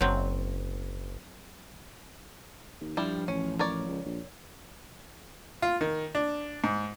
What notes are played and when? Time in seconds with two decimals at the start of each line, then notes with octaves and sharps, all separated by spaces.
0.01 F#1 F#3 C4
2.81 D#2
2.97 G2 F3 G3 E4
3.28 A1 C#4
3.59 A#4 C#5 D5
3.88 C#2
4.06 A#1
5.62 F4
5.81 D#3
6.15 D4
6.64 G#2